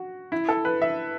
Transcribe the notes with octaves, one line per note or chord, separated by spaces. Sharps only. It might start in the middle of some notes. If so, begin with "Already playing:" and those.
Already playing: F#4
E4
A4
B4
E5